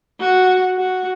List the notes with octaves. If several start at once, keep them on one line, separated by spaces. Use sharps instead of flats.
F#4
F#4